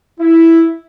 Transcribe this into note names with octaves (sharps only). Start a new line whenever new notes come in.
E4